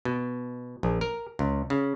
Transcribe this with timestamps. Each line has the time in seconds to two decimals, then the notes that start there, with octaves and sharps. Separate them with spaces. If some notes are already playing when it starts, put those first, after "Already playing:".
0.05 B2
0.83 A#1
1.01 A#4
1.39 C#2
1.70 C#3